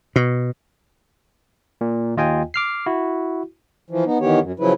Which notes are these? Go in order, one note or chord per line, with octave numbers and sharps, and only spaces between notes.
B2
A#2
D#2 F4 D#5 G5 G#5
D6 F6 C7
E4 F#4
E3 F3
B3 D#4
D#3 E3 B3 G4 C#5
F#2
C#3 F3 F#3 E4 B4